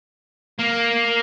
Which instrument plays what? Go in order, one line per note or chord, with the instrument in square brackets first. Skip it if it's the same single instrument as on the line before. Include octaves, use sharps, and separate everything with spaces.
[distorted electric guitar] A#3